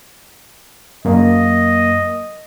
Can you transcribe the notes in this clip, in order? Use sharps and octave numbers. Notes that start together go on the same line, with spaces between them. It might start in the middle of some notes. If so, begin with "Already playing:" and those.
F#2 A#3 D#5